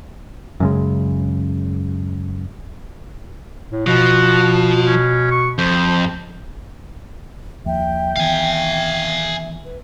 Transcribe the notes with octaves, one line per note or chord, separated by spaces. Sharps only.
F#2 C#3 G#3
A2
B2 F3 F#4
C#4
C#6
F2 C5
D#2 F3 A#3 E5 G5
D#3 E3 B3 F5 G#5
B4